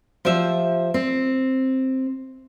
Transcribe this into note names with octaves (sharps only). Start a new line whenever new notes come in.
F3 G4 C5 E5
C4